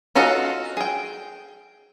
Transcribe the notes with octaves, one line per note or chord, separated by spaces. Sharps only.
C#4 D#4 F4 F#4 A4
G#4 G5